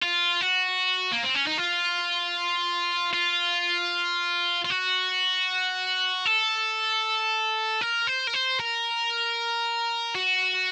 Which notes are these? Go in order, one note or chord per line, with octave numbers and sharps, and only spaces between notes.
F4
F#4
A#3
C4
C#4
D#4
F4
F4
F4
F#4
A4
A#4
C5
A#4
C5
A#4
F#4